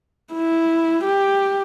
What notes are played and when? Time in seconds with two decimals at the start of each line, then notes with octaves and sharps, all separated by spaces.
0.34 E4
1.04 G4